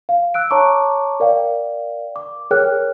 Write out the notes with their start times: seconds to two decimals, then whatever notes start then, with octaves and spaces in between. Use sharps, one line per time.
0.09 F5
0.34 E6 F#6 D7
0.51 C#5 A5 A#5 C#6 D6
1.20 A#4 D5 F5 G5
2.16 D6
2.51 G#4 A#4 C#5 G5 F6 F#6